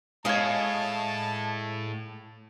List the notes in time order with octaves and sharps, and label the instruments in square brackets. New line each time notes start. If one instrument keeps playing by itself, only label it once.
[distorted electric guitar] A2 [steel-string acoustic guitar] G#3 F5 [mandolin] C#5 D#5 [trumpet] A5